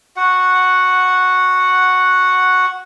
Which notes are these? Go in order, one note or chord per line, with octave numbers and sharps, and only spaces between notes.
F#4 F#5